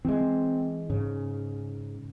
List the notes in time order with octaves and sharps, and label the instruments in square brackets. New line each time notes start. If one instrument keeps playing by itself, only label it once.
[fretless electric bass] E3 G#3 [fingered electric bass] C4
[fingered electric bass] G#2 [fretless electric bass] C#3